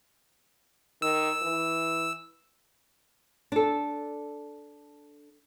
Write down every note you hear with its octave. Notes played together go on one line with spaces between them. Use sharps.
D#3 E6
E3
D4 A4